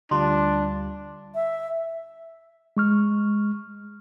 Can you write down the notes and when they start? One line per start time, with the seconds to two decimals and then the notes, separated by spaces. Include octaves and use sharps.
0.11 D2 G3 D4 F4 C6
1.35 E5
2.77 G#3 C#6 F6